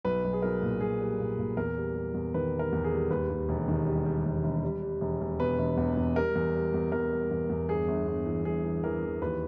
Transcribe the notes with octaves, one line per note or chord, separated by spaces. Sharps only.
B1 B4
B1
G#4
B1 A#4
A#2
B1 G#4
G3
A#2
A#2
E2 A#4
G3
G3
E2
D#3 B4
G3
A#4
E2
G#4
G3
D#2 B4
D#2
E1
D#3
G3
G3
E1
E1
G3
G3
E1
E1
B2 B4
E1
E2
E2
G3 A#4
E2
G3
E2
E2 A#4
G3
E2
E2
G1 G#4
G1
G1
E3
G1 G#4
E3
E3 A#4
E3
D#2 B4